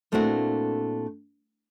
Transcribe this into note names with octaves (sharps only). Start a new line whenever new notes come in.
A#2 A3 C4 D4 E4 F#4